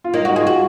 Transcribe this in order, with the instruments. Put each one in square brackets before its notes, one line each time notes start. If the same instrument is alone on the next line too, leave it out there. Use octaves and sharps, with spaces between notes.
[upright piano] F4
[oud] A#3 [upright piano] D#4
[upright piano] D#4 [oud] F#4
[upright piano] F4 [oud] G#4
[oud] F#4